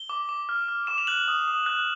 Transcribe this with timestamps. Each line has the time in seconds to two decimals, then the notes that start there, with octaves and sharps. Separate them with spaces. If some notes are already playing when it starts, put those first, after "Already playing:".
Already playing: G7
0.09 D6
0.29 D6
0.49 F6
0.68 F6
0.87 D6 E7
0.98 F7
1.07 F#6 F#7
1.28 D#6
1.48 D#6
1.66 F#6